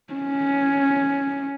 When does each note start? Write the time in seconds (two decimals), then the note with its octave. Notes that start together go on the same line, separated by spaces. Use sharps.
0.14 C#4